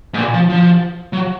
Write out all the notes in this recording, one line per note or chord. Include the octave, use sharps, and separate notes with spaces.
G#2
A#2
F3
F3
F#3